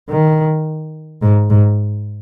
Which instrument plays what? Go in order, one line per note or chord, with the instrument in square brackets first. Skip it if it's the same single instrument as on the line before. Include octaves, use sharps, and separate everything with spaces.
[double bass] D#3
G#2
G#2